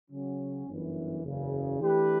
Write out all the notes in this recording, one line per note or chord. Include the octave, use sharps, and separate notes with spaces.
C#3 F#3 C#4
G1 F#2 E3
F#1 E2 C#3
E3 A3 D4 G4 B4